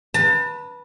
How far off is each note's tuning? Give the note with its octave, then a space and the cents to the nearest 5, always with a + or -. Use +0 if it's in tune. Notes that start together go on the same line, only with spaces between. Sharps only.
B4 -15 A5 +35